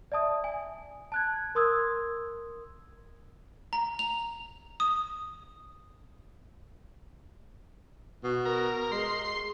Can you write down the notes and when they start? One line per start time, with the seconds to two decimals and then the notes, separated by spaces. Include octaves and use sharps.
0.12 D5 E5 A5 D#6
0.44 G#5
1.12 A5 F#6 G#6
1.55 A#4 C6 D#6 E6 G#6
3.73 A#5
3.99 F7
4.80 D#6
8.24 B2
8.46 A#4
8.92 G#3 C6